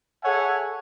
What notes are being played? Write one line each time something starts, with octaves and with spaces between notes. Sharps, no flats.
G#4 A4 C#5 E5 F#5 G#5